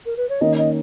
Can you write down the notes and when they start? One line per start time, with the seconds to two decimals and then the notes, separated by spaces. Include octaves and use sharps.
0.06 A#4
0.17 B4
0.29 C#5
0.41 D#3 A#3 C#4 D#5
0.58 D#5